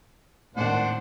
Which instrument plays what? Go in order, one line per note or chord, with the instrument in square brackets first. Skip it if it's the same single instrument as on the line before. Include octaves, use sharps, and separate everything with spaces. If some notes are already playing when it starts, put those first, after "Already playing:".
[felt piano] G#1 D#2 [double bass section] A2 [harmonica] D4 C5 F#5